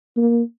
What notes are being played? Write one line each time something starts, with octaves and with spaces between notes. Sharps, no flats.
A#3